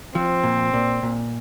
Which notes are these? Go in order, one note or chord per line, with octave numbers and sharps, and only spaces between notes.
F3 C4
A#2
A#2
A#2